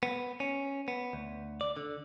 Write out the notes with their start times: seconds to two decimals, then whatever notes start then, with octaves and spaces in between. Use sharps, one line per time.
0.03 B3
0.40 C#4
0.88 B3
1.13 D2
1.61 D5
1.77 D3